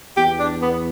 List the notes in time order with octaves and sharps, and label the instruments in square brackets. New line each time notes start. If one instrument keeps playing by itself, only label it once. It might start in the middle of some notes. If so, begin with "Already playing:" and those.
[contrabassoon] E2 [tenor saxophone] G4
[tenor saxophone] D4
B3